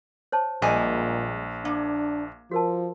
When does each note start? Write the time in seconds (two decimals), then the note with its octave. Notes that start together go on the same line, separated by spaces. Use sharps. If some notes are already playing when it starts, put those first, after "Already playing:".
0.32 C5 C#5 A5
0.62 A#1 A#2 G3 G#3 G#5
1.65 A#3 D4
2.51 F3 F#4 A#4 A5